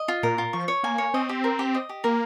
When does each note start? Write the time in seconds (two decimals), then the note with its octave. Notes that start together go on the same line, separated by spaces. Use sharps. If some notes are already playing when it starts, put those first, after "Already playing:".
Already playing: D#5
0.08 F4
0.23 A#2 A#4
0.38 F4
0.53 F3 C#6
0.68 C#5
0.83 A#3 G#5
0.98 C#5
1.14 C4 D#5
1.29 G4
1.44 A#4
1.59 G4
1.75 D#5
1.89 G4
2.04 A#3 A#4